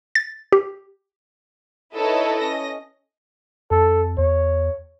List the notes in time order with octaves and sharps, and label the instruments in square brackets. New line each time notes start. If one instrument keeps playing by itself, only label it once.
[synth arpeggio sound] A6
G4
[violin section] D#4 E4 A4 B4 C#5 D#5
C#4 D#5 A#6
[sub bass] F2 [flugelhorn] A4
[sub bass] E2 [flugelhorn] C#5